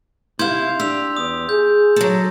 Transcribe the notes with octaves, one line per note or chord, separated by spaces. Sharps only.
C3 E4 F5 C6 G6 G#6
D4 G4 E6 F7
E2 D#6
G#4 G6
F#3 A4